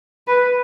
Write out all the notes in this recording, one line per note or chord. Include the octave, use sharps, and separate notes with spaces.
B4